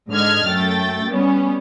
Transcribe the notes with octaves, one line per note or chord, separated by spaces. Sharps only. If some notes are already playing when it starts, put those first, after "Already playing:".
G#2 D3 D#5 F6 G#6
F#2 A3 G5 A6
G3 B3 C#4